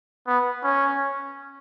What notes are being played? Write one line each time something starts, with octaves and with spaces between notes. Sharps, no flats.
B3
C#4